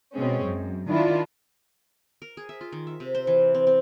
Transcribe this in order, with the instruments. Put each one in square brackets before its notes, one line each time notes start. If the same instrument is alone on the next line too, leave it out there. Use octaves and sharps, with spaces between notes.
[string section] B2 G#3 C4 C#4
F#2
D#3 D4 E4 F4
[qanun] A#4
G#4
E5
F4
D#3
E5
C3
C5
E3
C4
C4